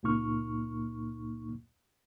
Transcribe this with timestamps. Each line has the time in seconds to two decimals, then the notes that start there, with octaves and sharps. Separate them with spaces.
0.03 C#2 A#2 A#3 D#4 C#6 F6